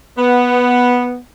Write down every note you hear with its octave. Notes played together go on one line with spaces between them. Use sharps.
B3